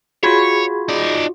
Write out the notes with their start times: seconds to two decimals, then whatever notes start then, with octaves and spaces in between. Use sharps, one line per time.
0.23 F4 F#4 G#4 C#5 B5 G#6
0.89 D#4 D5